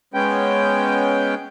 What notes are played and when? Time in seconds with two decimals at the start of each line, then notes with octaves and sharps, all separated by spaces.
0.14 G#3 B3 C#4 G5